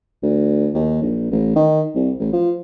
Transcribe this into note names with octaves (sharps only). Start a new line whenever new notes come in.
D2
D#2
A#1
A1
D#3
C2
A1
F3